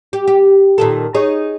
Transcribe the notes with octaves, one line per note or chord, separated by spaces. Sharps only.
G4
G4
A#2 D#3 A4
D#4 G#4 C#5